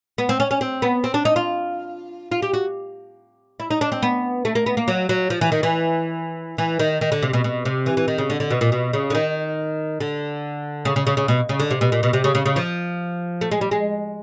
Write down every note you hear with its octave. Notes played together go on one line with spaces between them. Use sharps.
B3
C4
C#4
C#4
C4
B3
C4
D4
D#4
F4
F4
G4
F#4
E4
D#4
D4
C4
B3
A3
A#3
B3
A#3
F#3
F#3
F3
E3
D#3
E3
E3
D#3
D#3
D3
C3
B2
B2
C3
E3
E3
D#3
C#3
D3
D3
B2
A#2
B2
C#3
D3
D#3
D3
C#3
C#3
C#3
C#3
B2
C#3
D3
C3
B2
A#2
B2
C3
C#3
C#3
C#3
F3
A3
G#3
G3
G#3